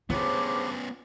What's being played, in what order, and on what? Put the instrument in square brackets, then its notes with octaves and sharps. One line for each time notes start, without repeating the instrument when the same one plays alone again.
[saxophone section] G2 C#3 C#5 [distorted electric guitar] B3 C#4 [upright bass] F4 [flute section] C5 D6